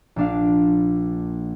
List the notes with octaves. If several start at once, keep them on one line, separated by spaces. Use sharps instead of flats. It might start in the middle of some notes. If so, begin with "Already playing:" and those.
A#1 D4 F5